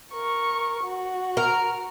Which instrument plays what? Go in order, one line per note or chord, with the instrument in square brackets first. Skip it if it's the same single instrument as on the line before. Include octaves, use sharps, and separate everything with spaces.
[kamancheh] A#4 C#6
F#4
[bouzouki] A#4